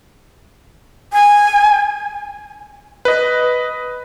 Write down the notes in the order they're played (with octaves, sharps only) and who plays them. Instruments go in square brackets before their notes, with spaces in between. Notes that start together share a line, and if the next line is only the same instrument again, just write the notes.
[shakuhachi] G#5
[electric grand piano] B4 D#5